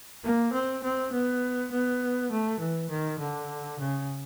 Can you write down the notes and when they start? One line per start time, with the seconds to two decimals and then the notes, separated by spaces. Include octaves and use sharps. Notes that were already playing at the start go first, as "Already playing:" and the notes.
0.24 A#3
0.53 C4
0.83 C4
1.12 B3
1.71 B3
2.31 A3
2.60 E3
2.90 D#3
3.19 D3
3.79 C#3